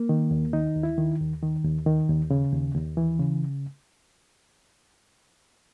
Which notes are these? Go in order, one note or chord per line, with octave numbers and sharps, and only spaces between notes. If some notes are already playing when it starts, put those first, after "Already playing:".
Already playing: A#3
D#3
D#2
D#3 D#4
D#2
E4
D#3
D#2
D#3
D#2
D#3
D#2
C#3
D#2
D#2
E3
C#3